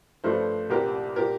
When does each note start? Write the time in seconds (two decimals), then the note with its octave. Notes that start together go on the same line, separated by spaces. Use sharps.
0.24 G2 F3 A3 A4 C5
0.70 C2 A#2 G3 G4 A#4
1.16 A#2 G3 G4 A#4